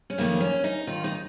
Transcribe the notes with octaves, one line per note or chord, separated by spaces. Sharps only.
C#4
F2 D#3 A#3
C#4
D#4
D#2 D#3 F4
D#4